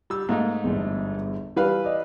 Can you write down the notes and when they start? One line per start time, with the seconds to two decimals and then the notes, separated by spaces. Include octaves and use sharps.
0.10 G3 E6
0.29 G#2 A3 A#3 D#4
0.64 G1 E2
1.56 E3 G3 B4 F5
1.84 D5 D#5